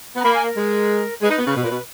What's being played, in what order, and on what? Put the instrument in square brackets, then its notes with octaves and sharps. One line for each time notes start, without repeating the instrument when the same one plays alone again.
[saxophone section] B3
[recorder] A#5
[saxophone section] A#3 [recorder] B5
[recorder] G#5
A#4
[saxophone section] G#3
[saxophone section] G#3 [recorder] B4
[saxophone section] D#4
B3
C#3
B2
A#2
B2